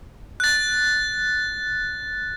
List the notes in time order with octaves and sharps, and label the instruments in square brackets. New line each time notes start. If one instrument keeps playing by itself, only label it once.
[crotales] F#6 A6